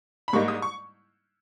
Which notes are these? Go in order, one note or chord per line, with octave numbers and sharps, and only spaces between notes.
B5
G#2 G3 A#3 D#4 C#6
D#6
C#6